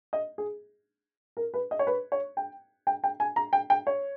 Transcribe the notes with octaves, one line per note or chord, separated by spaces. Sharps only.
D#5
G#4
A#4
B4
D#5
C#5
B4
C#5
G5
G5
G5
G#5
A#5
G5
G5
C#5